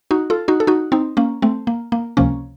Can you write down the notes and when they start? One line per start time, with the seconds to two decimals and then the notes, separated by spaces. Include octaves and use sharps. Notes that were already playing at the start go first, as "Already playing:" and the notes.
0.11 D#4 F#4
0.30 F4 A4
0.48 D#4 F#4
0.60 A4
0.67 D#4 F#4
0.92 C4 D#4
1.17 A#3 C#4
1.42 A3 C4
1.67 A#3
1.92 A#3
2.17 C#2 C3 F3 A#3 C#4